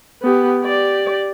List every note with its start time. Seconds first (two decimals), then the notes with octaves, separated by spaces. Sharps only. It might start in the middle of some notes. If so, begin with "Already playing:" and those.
0.22 B3 G4
0.60 G4 D5